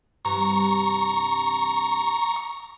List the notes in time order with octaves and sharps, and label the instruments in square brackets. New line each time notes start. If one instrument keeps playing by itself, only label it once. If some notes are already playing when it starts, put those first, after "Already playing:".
[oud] G2 C3 E3 [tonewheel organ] A#5 C#6